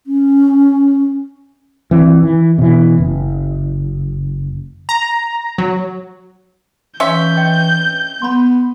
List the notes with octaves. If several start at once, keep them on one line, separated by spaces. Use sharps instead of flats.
C#4
E3 C4
E3
B2 E3
F#1
A#5
F#3
E3 C#4 E5 F5 C6 G6
D#5 G5
B3 B5 C6